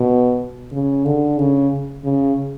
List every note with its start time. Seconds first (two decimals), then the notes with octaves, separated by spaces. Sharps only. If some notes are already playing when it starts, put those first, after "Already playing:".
Already playing: B2
0.72 C#3
1.05 D3
1.38 C#3
2.04 C#3